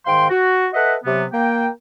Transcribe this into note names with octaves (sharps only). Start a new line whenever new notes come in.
G#2 D#3 F5 G5 C6
F#4
A4 B4 D#5 E5 F#5
C3 F#3 B3
A#3 G5